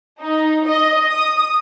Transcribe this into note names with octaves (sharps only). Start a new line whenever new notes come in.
D#4
D#5
D#6